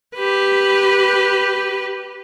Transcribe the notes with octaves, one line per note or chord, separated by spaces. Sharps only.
G4 B4